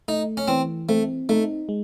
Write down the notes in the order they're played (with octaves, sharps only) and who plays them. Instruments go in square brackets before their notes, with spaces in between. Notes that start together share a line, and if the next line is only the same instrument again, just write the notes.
[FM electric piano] A3 [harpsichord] D#4
[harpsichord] C#4
[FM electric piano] E3 [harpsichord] C4
[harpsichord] A3 [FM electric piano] C4
[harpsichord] A3 [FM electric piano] D#4
[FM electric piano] G#3